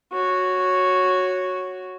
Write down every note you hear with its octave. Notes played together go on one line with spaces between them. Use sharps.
F#4 C#5